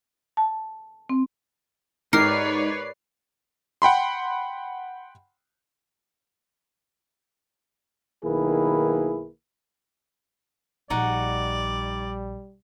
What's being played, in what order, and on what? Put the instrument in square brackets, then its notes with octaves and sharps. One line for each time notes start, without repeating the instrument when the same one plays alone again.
[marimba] A5
C4
[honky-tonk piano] G#2 [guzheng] G4 A#4 [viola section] B4 C#5 D5 [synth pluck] C7
[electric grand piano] F#5 G5 B5 C6
[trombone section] B1 D#3 A#3 E4 G#4 B4
[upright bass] A#1 [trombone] G3 [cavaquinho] D#4 F#4 F#5 [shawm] D5